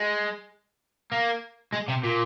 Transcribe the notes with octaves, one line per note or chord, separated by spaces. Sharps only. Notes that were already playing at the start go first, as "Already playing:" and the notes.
Already playing: G#3
A#3
G#3
C3
A#2